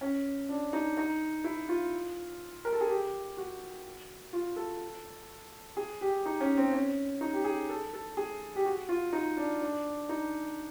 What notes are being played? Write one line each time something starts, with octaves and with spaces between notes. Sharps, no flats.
C#4
D4
D#4
D#4
E4
F4
A#4
A4
G#4
G4
F#4
F4
A4
G#4
G4
D#4
C#4
C4
C#4
D#4
G4
G#4
A4
A4
G#4
G4
F#4
F4
D#4
D4
D4
D#4